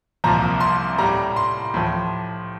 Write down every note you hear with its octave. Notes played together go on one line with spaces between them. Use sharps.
C2 A#2 F3 A#5
C6
A2 G3 A#5
C6
A2 F3